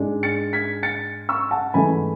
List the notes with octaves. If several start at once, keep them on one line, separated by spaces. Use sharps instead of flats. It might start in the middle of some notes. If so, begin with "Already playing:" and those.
Already playing: G#2 G#3 D4
A6 C#7
G#6 B6
A6 C#7
C#6 E6
F#5 A5
G#2 E3 A3 G#5 B5